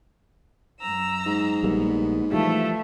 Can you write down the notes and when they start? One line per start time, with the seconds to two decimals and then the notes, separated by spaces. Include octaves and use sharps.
0.80 F#2 A#5 E6
1.26 G#2
1.63 A#1 G3 A#3 B3
2.32 E3 F3 G3 A3 E5 F5